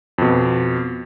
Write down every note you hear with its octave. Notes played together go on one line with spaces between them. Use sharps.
F2 B2